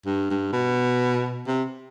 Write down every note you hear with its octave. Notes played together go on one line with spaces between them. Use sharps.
G2
G2
B2
C3